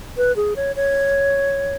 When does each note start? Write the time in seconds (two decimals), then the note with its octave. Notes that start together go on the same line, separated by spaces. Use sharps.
0.17 B4
0.36 G#4
0.56 C#5
0.76 C#5